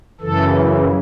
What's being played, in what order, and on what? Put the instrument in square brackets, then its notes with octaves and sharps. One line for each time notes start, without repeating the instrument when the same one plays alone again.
[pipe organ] F#2 C#3 E3 A4